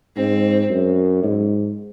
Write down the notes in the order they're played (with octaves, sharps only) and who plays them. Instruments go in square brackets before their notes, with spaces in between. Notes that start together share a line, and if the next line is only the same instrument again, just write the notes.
[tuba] G#2 [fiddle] C4
[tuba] F#2
G#2